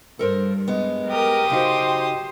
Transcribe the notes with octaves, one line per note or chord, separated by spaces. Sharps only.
G2 A4 A#4 C5
G#3 B3
G4 A#4 D#6
C#3 D#4 F#4 C5